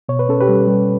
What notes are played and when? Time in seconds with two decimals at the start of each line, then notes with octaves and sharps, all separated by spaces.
0.09 B2 C#5
0.19 B4
0.29 C#4 A4
0.41 G4 B4
0.49 G3
0.68 G3